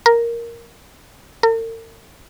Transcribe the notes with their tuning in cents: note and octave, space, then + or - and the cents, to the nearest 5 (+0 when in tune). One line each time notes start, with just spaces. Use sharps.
A#4 +0
A#4 -45